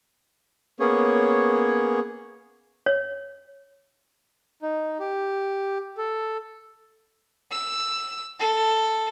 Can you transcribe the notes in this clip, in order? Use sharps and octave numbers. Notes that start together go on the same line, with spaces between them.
A#3 B3 C#4 G#4 C#5
C#5
D#4
G4
A4
E6
A4